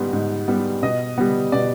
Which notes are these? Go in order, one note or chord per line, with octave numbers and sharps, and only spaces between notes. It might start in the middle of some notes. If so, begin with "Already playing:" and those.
Already playing: G#2 G3 B3
G#2
G3 B3
B2 D#5
G3 B3
B2 D5